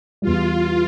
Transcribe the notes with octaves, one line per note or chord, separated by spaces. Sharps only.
E2 E3 G3 F4